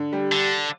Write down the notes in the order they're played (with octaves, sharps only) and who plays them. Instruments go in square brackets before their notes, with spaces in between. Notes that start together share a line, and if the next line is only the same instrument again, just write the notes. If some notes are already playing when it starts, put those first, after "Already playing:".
Already playing: [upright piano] D3
G3
[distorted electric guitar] D3